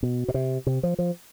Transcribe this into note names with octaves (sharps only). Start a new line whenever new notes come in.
B2
B2
C3
C3
F3
F3